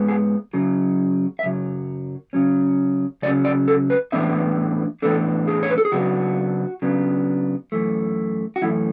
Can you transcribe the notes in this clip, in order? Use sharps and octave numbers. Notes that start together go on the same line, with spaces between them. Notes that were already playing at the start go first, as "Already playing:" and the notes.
Already playing: G#2 G#3 B3
G#4
F#2 C#3 F#3
E5
F#2 C#3 F#3
C#3 F#3 C#4
C#3 F#3 C#4 D5
D5
A4
B4
A2 E3 G#3 B3 D4 E5
A2 E3 G#3 B3 D4 A4
G#4
C#5
B4
A4
G#4
C#3 F#3 B3 D4 F#4
C#3 F#3 B3 D4
F#2 E3 A3
F#4
F#2 E3 A3 E4